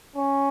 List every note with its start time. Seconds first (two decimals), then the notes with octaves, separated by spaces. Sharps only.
0.16 C#4